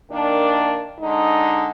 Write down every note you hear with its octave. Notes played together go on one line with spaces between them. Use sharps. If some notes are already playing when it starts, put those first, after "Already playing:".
D#3 A#3 D4
D3 G#3 D#4